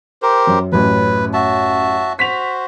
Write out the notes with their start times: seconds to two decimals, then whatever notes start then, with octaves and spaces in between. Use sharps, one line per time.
0.22 G4 A#4 C5
0.47 F#2
0.72 A1 F#2 B4
1.34 F#4 E5 A5
2.19 F#4 C5 B6 F7